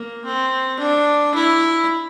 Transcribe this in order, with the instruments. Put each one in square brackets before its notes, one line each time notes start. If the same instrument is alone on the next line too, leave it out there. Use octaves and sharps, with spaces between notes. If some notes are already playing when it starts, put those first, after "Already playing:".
Already playing: [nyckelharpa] A#3
C4
D4
E4